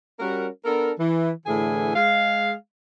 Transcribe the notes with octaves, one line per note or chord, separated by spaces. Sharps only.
G3 C#4 F#4 A#4
B3 D4 A4 A#4
E3
A2 D3 E3 G#4 G#5
G#3 F5